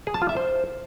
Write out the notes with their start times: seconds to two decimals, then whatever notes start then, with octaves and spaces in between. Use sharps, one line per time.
0.07 G#4
0.14 A5
0.22 F4
0.29 E5
0.37 C5